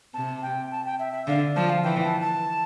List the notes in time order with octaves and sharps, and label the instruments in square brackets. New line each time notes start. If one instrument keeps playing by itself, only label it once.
[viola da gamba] C3 [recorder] A5
[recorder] G5
A5
G5
E5
E5
[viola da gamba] D3 [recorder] F5
[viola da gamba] F3 [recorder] A5
[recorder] F5
[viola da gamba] E3 [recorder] G5
[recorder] A5
A5